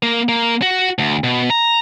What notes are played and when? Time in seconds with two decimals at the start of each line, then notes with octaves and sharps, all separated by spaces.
0.03 A#3
0.29 A#3
0.62 F#4
0.99 D2
1.24 B2
1.50 A#5